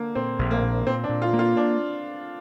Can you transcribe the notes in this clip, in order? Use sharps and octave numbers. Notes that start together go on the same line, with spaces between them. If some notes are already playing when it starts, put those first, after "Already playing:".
Already playing: D3 A#3
A#2 C4
A#1
A#3
A#2
A#2 C4
D4
A#2
F4
A#3
F4
D4